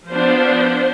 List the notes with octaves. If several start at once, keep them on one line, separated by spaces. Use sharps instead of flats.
F3 B3 D4 C5